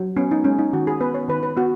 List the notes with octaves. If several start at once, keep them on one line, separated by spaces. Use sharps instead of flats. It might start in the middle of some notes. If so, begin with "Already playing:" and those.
Already playing: F#3
B3 C#4
D#4
G#3 C#4
D#4
D#3 F#4
G#4
B3 B4
C#5
D#3 B4
B4
B3 F#4